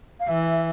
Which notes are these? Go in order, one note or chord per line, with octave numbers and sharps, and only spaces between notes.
F5
E3 E5